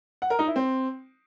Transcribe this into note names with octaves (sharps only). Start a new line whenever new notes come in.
F#5
A#4
D#4
E4
C4